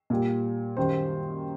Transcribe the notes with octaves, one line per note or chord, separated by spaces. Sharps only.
A#2 G3
F#2 D#3 G3 C5